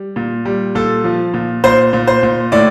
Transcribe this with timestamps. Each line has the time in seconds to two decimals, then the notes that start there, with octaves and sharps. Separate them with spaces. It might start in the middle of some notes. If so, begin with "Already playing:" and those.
Already playing: G3
0.16 A#2
0.45 G3
0.75 A#2 A4
1.04 F3
1.34 A#2
1.64 A#2 C5
1.93 A#2
2.07 C5
2.23 A#2
2.52 A2 D5